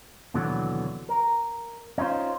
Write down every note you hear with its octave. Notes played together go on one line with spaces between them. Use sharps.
D#2 B2 D3 E3 F#3 B3
A#4
C#4 D#4 F4 C5